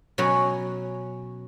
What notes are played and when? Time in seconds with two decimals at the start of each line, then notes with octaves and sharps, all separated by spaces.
0.18 B2 F#3 C#4 C#5 F#5 A#5